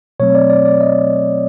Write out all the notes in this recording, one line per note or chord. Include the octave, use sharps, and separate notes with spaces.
B2 F#3 A3 C4 C#5
D5
D5
D5
D#5